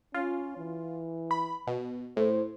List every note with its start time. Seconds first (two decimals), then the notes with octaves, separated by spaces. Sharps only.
0.14 C#4 F4
0.57 E3
1.31 B5
1.67 B2
2.17 A2 C5